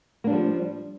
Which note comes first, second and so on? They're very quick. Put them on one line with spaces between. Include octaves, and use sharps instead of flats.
A#3 D4 G3 F3